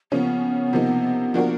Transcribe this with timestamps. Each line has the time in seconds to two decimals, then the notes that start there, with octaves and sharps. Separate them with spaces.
0.12 C#3 F3 A#3 B3 C#4
0.73 C3 F3 A#3 D#4
1.34 F3 A#3 D4 F#4 A#4